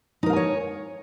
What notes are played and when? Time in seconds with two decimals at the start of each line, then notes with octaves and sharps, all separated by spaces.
0.23 D#4
0.26 A#4
0.30 F5
0.33 G#5
0.36 C#5